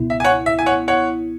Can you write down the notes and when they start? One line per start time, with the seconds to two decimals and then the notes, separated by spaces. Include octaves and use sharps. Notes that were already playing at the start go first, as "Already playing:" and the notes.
Already playing: C#2 B2 B3 E4
0.10 E5
0.20 G#5
0.24 C#5 F#5
0.46 E5
0.59 G#5
0.66 C#5 F#5
0.88 C#5 F#5